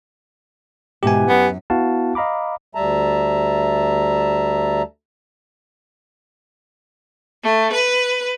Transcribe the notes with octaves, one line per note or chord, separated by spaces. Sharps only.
G#2 B2 E3 G4 G#5
F#2 B3
B3 E4 F#4 F5 F#5 A5
D#5 F5 A#5 B5 D6
D2 G3 E5 A5 A#5
A3
B4